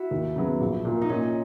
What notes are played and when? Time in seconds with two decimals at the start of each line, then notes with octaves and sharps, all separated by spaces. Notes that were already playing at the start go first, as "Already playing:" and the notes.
Already playing: E4 F#4
0.11 D#2
0.36 C#3 F#3 B3
0.60 A#1
0.85 A#2 A#3
1.01 D#4
1.09 A#2 C#4